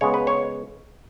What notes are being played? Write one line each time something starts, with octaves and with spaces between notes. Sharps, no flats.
C#3 G#3 B3 C#5
B4
C#5